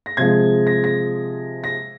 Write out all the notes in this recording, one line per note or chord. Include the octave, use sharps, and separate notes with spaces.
A#6
C3 F3 G#3 G#6
A#6
A#6
A#6